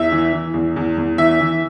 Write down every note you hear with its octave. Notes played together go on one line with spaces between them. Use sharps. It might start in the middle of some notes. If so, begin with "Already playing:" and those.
Already playing: E2 E5
E3
E3
E2
E2
E2
E3 E5
E3